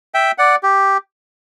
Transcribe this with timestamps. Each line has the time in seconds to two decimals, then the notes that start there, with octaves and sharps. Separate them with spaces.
0.14 E5 G5
0.38 D5 F#5
0.63 G4